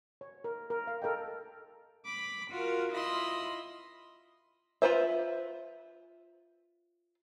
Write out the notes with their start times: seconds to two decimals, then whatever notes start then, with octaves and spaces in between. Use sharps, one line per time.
0.21 C#5
0.44 A#4
0.70 A#4
0.87 F5
1.02 A4 A#4 D#5 G5
2.06 B5 D6
2.53 F4 F#4 A#4
2.93 E4 F4 D#5 B5 C6
4.82 F4 A4 B4 C5 E5